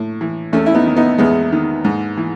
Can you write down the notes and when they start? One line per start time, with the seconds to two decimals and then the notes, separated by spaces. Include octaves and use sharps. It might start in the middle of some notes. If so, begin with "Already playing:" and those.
Already playing: A2
0.21 E3
0.53 E2 A3 C#4
0.66 E4
0.75 B3 D#4
0.87 D#3
0.96 B3 D#4
1.18 E2 G#3 B3
1.52 D#3
1.84 G#2
2.17 E3